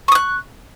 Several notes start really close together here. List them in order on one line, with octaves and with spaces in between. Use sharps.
C#6 D#6 F#6